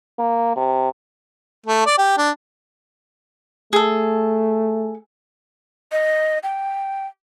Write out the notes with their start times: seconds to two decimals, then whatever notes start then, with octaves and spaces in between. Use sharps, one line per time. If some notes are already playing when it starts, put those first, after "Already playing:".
0.19 A#3
0.56 C3
1.66 A3
1.86 D5
1.98 G4
2.18 D4
3.73 A3 G#4 A4
5.92 D#5
6.43 G5